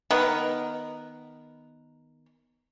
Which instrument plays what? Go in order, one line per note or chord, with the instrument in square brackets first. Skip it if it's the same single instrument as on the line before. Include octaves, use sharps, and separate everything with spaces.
[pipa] D#3 B3 A#4